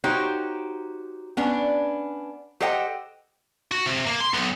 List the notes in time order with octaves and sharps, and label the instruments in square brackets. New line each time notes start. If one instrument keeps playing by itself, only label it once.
[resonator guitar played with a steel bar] D#4 F#4 G4 C5 C#5
B3 C#4 D4
G4 A4 C5 D#5 F#5 G5
[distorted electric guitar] F#4
C3
A#3
C6
B1